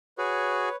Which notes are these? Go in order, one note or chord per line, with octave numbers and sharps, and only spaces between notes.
F#4 G#4 B4 C#5